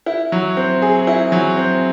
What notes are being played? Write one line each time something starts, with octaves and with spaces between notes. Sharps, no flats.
E4
F#3
C4
G#4
E4
F#3
C4